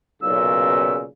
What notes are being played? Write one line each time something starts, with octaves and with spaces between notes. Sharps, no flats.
B1 A#2 C#3 E6